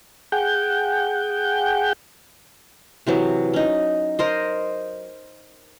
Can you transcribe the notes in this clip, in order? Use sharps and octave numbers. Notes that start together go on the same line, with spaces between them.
G#4 F#5 G5 G6
C3 E3 F#3
C#4 D#4
A#4 C5 D#5